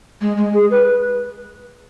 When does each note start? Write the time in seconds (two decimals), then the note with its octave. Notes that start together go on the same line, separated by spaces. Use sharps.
0.21 G#3
0.37 G#3
0.54 G#4
0.71 B4